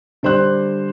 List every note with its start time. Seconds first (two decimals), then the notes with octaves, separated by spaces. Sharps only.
0.23 D3 G3 C5 D5 C6 F#6